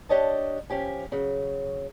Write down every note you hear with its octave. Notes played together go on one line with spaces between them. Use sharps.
D4 G4 C#5 D#5 A5
F3 C#4 G4 G#5
C#3 F#3